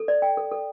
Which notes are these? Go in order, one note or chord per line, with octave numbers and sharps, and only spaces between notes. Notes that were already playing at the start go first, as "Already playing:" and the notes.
Already playing: A4
D5
G5
A4
A4